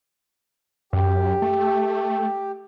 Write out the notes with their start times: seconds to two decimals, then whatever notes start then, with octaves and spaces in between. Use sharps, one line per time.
0.93 F#2 G4
1.42 A3